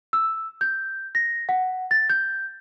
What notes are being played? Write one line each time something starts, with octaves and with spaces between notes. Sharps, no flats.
E6
G6
A#6
F#5
A6
G6